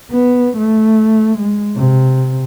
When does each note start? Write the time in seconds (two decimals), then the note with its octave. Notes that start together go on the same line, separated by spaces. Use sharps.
0.11 B3
0.57 A3
1.38 G#3
1.76 C3